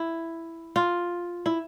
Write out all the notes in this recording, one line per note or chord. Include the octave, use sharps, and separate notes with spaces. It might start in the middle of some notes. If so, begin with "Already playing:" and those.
Already playing: E4
F4
E4